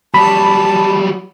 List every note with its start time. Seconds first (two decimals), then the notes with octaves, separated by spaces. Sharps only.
0.14 F#3 G3 A5 B5